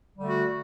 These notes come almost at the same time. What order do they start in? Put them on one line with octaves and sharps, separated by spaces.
G3 D3 A3 F#4